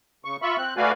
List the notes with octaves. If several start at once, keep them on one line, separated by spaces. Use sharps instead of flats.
C#3 C#6
F4 E5 B5 C#6
C4 F#6
A3 F#4 B4 D5 F5 G#5